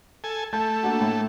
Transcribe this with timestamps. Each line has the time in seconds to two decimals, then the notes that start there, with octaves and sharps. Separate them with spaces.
0.24 A4 G#5
0.53 A3 A5 G6
0.83 A#3 D4 F#4
1.00 A2